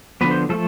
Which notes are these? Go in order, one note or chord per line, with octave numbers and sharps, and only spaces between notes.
D3 F3 B3 B4
C5
F3 A3 A4